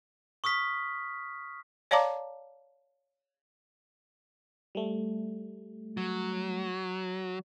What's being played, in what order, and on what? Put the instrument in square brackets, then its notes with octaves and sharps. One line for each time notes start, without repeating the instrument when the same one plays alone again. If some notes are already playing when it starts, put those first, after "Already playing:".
[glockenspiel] C#6 D#6 F6 B6
[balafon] C#5 D5 F5 A5 A#5 D6
[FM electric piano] G3 A3
[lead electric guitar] F#3